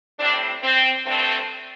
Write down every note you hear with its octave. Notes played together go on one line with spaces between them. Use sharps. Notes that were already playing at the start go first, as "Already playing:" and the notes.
A2 G3 C4 D4
C4
G2 D3 A3 C4